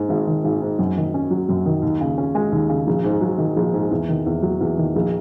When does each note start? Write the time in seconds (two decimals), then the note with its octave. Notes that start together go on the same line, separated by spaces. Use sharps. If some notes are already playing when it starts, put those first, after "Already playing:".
Already playing: G#2
0.09 G#1
0.27 D#3
0.44 G#1
0.62 G#2
0.79 F#2
0.97 D#3
1.14 C#4
1.30 F#3
1.49 F#2
1.66 D#3
1.82 D#2
2.01 C#3
2.18 C#4
2.35 G#3
2.52 D#2
2.69 C#3
2.87 A#1
3.04 G#2
3.21 F#3
3.38 D#3
3.56 A#1
3.73 G#2
3.91 E2
4.09 D#3
4.26 E2
4.42 F#3
4.61 E2
4.78 D#3
4.95 A#1